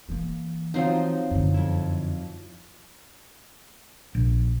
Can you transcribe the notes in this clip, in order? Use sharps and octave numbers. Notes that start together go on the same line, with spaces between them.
E3 A#3
F3 F#3 C4 D#4 C5 F5
F#2 D3
F2 E4
A#1